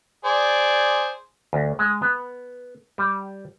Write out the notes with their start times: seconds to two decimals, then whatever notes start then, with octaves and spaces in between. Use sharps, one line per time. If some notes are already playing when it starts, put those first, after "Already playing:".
0.25 G#4 C5 D5
1.53 D2
1.79 G#3
2.02 B3
2.98 G3